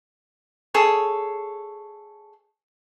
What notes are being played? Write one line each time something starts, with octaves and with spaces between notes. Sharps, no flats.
G#4 A4 C#5